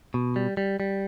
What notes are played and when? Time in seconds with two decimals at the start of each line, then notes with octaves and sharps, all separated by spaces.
0.14 B2
0.36 G3
0.57 G3
0.80 G3